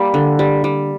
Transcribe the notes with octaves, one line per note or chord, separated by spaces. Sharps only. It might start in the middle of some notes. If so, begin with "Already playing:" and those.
Already playing: G3 A#3
D3
G3
G3